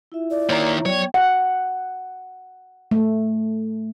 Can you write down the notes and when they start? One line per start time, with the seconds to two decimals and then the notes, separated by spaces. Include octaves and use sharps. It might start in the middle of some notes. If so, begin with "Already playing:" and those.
0.12 E4 F4 E5
0.31 D5
0.49 D#3 A#3 C#5 A#5
0.86 F#3 B3 C#5 D5 G5
1.14 F#5
2.91 A3